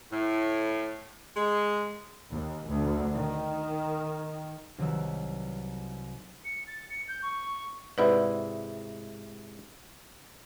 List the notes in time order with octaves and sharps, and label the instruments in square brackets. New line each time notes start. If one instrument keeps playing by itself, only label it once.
[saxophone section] A2
G#3
[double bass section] D#2
D2
D#3
[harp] C2 D#3 F#3 B4 E6
[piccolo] C#7
A6
C#7
G6
C#6
[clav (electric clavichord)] G#2 C3 E4 [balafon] B4 D5 F#5